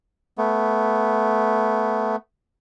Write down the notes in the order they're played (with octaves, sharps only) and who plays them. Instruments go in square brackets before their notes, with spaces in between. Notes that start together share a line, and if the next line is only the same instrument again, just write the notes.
[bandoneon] A3 B3